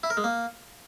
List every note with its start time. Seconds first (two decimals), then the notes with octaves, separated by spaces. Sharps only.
0.03 E4
0.10 A#4
0.17 G#3
0.24 A#3